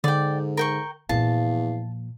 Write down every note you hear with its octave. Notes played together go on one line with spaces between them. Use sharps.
G#2 D3 D5 G5
A#4 G5 C#6
E2 A#2 F3 F5 A5